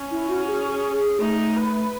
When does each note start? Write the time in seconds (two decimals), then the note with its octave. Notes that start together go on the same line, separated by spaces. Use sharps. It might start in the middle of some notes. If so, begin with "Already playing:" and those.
Already playing: C#4
0.11 E4
0.29 F#4
0.47 G#4
0.71 G#4
0.96 G#4
1.20 A3 D#4
1.56 B4